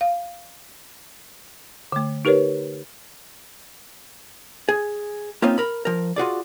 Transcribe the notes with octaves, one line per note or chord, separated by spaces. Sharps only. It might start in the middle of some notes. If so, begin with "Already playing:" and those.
F5
D3 A3
D#4 G4 A#4 B4 C#5
G#4
A#3 C4 C#4 D#4 F4 C5
A#4 B5
F3 A#4
F4 F#4 G#4 D5